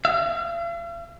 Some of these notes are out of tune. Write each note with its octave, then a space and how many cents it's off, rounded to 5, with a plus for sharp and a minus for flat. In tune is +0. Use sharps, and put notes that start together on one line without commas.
F5 -45